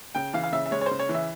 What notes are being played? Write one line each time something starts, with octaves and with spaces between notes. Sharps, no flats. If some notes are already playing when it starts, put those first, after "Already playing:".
C#3 G5
E3 F5
F5
C#3 E5
E5
G#3 C#5
C#5
C5
C#3
C#5
E3
E5